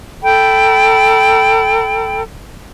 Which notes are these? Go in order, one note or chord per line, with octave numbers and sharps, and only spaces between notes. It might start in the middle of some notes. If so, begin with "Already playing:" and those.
A4 G5 B5